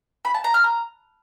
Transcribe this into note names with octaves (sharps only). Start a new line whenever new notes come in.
B5
A5
A#5
F6
A#5